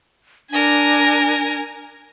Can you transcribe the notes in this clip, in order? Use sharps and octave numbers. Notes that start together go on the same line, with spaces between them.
D4 A#4 G#5